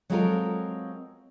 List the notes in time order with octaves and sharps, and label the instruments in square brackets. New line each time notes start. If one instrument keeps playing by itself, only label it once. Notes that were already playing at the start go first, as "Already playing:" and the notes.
[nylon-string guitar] F#3 G#3 C4 F4 A4 A#4